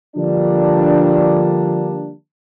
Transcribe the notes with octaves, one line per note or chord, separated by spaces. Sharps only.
D3 F3 G3 A#3 D4